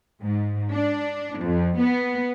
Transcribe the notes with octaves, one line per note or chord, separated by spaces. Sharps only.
G#2
D4
F2
B3